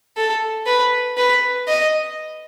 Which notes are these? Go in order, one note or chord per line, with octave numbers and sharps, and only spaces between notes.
A4
B4
B4
D#5